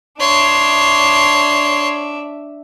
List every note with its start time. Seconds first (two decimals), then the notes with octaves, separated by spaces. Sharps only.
0.21 D4 C#5 E5 C6